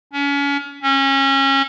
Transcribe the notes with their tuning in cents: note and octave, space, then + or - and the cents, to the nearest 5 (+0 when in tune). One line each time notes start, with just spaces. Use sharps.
C#4 +35
C#4 -25